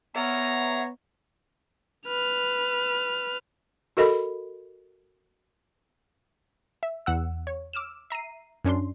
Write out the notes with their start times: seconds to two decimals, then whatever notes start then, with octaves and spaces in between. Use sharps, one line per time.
0.16 B3 C#5 E5 F#5 A#5
2.08 B4 F6
3.97 F#4 A4 A#4 D#5 B5
6.83 E5
7.06 E2 F#5 E6
7.47 C#5
7.73 D6 E6 F6 E7
8.10 E5 A#5 C7 D#7
8.64 F#2 C#4 D4 C6